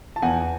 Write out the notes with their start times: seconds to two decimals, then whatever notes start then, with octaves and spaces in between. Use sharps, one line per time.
0.16 A5
0.22 E2 F#5 G#5